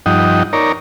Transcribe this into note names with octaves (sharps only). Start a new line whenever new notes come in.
G2 F3 D#4 D#5 F#5 G5
D#4 A#4 C#5 D5 A#5